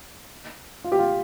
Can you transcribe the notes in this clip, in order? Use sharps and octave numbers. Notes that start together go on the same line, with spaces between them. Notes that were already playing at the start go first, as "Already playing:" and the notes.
F4
G4
F4